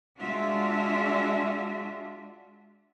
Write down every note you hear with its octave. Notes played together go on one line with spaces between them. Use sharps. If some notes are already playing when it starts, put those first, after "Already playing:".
G#3 D4 F4 F#4 E5